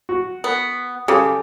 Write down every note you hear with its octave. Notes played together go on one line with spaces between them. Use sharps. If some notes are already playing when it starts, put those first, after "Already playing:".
F#4
B3
C#3 G4 A4 D6